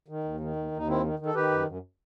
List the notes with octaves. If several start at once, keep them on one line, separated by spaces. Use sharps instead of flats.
D#3
D#2
D#3
D#2
D#2
D#4
D#3 C4 E4
D#3
D#3
A4
D#3 G4 B4
F#2
F#2